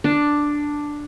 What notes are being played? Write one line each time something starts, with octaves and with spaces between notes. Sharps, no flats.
D4